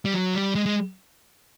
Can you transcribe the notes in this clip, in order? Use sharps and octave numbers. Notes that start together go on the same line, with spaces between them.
G3
F#3
G3
G#3
G#3